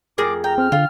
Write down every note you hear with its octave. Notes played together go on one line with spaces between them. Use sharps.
F2 G#4 A#4 D6
G5 A#5
C4 F6
D3 F4